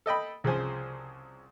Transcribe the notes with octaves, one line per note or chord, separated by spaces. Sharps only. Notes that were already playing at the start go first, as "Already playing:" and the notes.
A4 D#5 G5 B5
C2 C#3 F3 C5 G#5